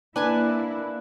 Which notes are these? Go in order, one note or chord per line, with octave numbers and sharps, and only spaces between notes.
A#3 D4 E4 B4 G#5 A5